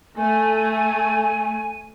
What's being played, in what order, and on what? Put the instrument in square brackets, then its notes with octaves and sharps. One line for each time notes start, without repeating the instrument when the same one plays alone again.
[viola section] A3 [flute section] G#5